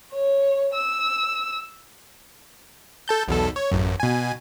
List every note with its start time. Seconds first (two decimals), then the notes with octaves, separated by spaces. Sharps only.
0.12 C#5
0.74 E6
3.08 A4 A5 G6
3.28 B1 E2 A4
3.56 C#5
3.71 A1 F#2
4.00 B2 G#5